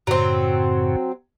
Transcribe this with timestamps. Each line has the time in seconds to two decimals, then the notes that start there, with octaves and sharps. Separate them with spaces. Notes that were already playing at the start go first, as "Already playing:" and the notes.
0.07 F#2 A2 C#3 F#3 C4